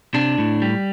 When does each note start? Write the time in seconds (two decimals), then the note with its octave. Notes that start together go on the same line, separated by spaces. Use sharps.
0.14 C3 D4
0.38 A2
0.62 G3